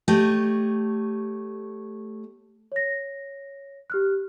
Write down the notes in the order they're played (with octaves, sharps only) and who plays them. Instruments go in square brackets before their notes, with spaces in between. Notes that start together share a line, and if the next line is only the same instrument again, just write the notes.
[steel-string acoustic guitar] A3 G4 C#5 D#5
[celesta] C#5 A#6
G4 F6 F#6